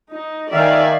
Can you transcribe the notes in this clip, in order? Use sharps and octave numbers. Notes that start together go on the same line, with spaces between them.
D#4
D#3 D5 E5 F5 G#5